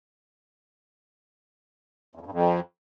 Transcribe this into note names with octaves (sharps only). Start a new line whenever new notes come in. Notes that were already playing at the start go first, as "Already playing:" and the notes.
E2
F2
G2
F2